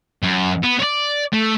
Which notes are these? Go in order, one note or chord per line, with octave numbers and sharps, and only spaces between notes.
F#2
B3
C#5 D5
A3